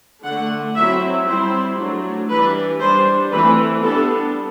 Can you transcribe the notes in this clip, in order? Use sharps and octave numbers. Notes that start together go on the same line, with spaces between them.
D3 A3 D4 F#5
F#3 C4 E4 E5
G3 C4 E4 C5
F#3 A3 D4
E3 G3 D4 B4
G3 D4 C5
E3 A3 C4 B4
G3 B3 D4 A4